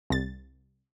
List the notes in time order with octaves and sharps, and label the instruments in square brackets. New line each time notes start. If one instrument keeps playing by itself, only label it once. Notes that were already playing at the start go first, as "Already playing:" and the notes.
[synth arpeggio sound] C2 A6